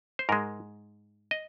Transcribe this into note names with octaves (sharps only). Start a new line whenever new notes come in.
C5
G#2 G#3 A#4
D#5